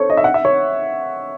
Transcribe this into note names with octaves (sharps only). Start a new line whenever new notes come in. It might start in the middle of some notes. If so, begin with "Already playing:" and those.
Already playing: A4 C5 C#5
D#5
E5
F#5
E5
C#5